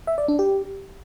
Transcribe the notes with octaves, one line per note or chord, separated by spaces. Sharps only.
E5
D5
D4
G4